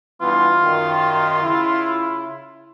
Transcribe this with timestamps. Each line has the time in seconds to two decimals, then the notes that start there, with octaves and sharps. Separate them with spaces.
0.21 G2 E3 B3 F4
0.64 F#2 D#3
1.43 C#3 E4